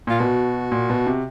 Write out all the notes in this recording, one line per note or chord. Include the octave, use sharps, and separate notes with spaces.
A#2 F4
B2 F#4
A#2
B2
C3